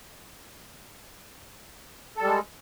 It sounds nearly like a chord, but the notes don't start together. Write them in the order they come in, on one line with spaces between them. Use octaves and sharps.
A4 G3 G#3